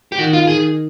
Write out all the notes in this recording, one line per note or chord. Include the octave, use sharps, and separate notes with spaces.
G4
D#3 F#4
F4
D#3 G#4